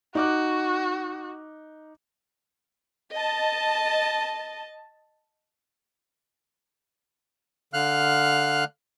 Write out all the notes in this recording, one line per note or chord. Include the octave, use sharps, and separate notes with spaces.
D#4 F#4 D6 F#6
D#5 A5
D3 F5 F6 F#6